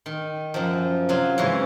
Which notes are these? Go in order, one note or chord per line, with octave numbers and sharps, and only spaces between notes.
D#3
F#2 F3
C3 F#3 F4
G#2 C#3 E3